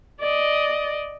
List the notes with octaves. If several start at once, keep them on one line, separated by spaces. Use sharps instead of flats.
D5 D#5